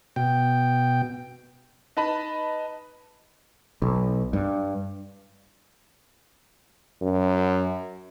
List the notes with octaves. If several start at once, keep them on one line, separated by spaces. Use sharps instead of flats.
B2 G5
D#4 B4 A5 B5
B1
G2
F#2